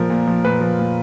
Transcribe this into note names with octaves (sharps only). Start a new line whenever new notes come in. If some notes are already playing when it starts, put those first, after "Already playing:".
Already playing: A#2 F3 A#4
A#2
F3
A#2 B4
F3
A#2